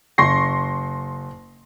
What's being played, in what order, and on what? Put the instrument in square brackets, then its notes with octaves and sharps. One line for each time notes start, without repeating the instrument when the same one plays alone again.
[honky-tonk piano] F#1 C6 C#6 A#6 C7